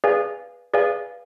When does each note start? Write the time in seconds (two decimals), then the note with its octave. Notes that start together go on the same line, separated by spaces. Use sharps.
0.04 G#4 B4 D5 F5 G#5
0.73 G#4 B4 D5 F5 G#5